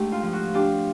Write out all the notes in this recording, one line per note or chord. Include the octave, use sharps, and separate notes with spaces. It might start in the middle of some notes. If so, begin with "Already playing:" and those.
Already playing: G#2 A3 D4 G4
F4
F3
F#4
D4 F4 G4